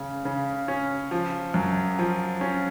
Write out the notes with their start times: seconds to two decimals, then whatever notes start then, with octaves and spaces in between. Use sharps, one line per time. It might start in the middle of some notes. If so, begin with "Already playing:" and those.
Already playing: C#3 C#4
0.25 C#3
0.68 C#4
1.11 F3
1.54 F#2
1.99 F3
2.41 C#4